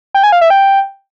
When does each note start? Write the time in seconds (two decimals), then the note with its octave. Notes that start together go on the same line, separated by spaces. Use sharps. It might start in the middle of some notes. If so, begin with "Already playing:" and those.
0.14 G5
0.23 G#5
0.32 F5
0.41 E5
0.50 G5